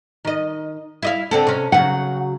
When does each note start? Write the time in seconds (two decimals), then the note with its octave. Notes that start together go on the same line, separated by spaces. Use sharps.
0.25 D#3 D#5
1.03 E4 D#5 F5
1.31 D3 C4 A4
1.47 C3 C#4
1.72 C#3 F#3 F#5